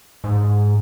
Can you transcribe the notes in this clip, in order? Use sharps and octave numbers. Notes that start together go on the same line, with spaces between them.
G#2